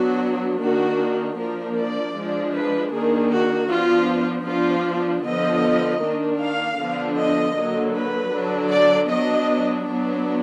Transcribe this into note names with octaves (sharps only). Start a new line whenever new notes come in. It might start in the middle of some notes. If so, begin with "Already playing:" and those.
Already playing: F#3 B3 D4 F#4
D#3 A#3 D4 F#4
F3 A#3 D4 A#4
D5
F3 G#3 D4
B4
D#3 A#3 D4 G#4
F#4
F3 B3 D4 F4
F3 B3 D4 F4
D3 F3 B3 D#5
D#3 A#3 D4
F5
D3 F3 B3 D4
D#5
D3 F#3 A#3
B4
D3 F#3 D4
D5
F#3 B3 D4 D#5
F#3 B3 D4